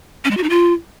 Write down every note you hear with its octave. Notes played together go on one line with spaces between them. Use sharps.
C#4
G#3
F#4
D#4
F4